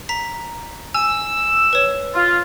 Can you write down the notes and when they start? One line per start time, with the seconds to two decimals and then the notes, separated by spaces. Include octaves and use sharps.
0.09 A#5 B6
0.94 G#5 E6
1.73 B4 C#5
2.15 F4